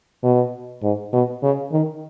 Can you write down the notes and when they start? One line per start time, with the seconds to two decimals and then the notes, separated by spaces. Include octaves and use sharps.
0.23 B2
0.83 G#2
1.13 B2
1.43 C#3
1.72 D#3